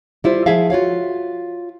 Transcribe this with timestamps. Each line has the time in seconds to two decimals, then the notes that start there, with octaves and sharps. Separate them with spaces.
0.24 G3 E4 F4 C5
0.46 F3 G#3 E4 G#4 E5 F5
0.70 F4 F#4 C#5 F5